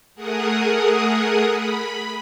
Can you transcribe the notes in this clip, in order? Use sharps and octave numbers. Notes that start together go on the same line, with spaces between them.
A3 G#4 A#4 F#5 D#6
B5